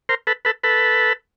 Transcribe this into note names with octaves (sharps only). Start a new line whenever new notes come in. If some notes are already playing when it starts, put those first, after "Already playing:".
A#4 C5
A4 B4
A4 B4
A4 B4